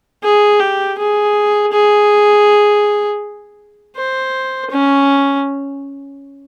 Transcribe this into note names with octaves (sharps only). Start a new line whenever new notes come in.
G#4
G4
G#4
G#4
C5
C#4